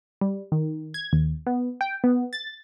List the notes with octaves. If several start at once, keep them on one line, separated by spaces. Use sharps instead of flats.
G3
D#3
G#6
D#2
B3
G5
B3
A6